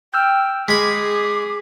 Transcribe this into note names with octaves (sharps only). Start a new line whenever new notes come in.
G5 E6 F6 G6
G#3 G#4 B5 D6 B6